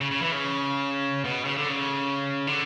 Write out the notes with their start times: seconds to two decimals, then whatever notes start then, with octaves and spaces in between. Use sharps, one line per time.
0.01 C#3
0.11 C#3
0.22 E3
0.32 C#3
1.24 B2
1.45 C#3
1.58 D3
1.69 C#3
2.47 D3